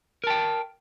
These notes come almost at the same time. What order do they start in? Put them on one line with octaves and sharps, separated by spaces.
A#4 A5 G5